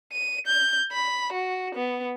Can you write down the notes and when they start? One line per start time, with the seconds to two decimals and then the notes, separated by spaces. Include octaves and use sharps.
0.13 D#7
0.47 G6
0.92 B5
1.32 F#4
1.75 B3